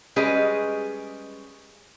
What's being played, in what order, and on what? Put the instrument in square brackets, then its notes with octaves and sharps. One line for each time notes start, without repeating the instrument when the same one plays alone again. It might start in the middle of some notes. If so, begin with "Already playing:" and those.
[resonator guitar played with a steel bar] G3 G#3 C#4 G#4 B4 D#5